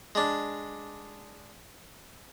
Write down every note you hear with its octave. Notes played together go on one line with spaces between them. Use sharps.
G#3 D4